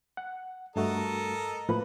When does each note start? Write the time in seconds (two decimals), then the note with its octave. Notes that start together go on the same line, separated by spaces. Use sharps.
0.17 F#5
0.76 G2 A3 F#4 A4 A#4 D#5
1.69 A2 F3 A#3 B4